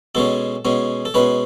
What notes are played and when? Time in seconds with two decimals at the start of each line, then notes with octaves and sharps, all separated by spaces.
0.15 B2 G#3 C#4 A4
0.65 B2 G#3 C#4
1.05 A4
1.14 B2 G#3 C#4 B4